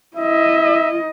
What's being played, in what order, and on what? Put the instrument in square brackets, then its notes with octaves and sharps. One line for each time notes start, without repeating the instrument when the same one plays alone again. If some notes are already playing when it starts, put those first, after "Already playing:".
[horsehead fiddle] E4 D#5 [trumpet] E5